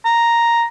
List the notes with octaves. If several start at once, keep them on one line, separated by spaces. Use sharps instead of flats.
A#5